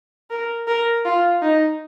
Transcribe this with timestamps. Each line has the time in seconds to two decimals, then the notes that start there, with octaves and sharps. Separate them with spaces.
0.30 A#4
0.67 A#4
1.05 F4
1.42 D#4